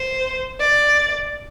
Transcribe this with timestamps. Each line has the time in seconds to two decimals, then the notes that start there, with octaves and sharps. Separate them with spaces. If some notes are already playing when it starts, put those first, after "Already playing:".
Already playing: C5
0.60 D5